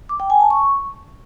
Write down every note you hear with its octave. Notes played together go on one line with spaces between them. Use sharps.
D6
G5
G#5
A5
C#6